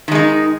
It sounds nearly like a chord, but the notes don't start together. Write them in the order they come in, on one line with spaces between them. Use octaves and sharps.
D#3 G#3 D#4